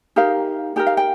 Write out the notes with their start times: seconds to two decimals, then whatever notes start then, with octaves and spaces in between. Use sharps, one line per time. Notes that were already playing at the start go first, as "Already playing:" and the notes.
0.16 D#4 G4 A#4 F5
0.76 D#4 G4 A#4 G5
0.87 F5
0.97 G5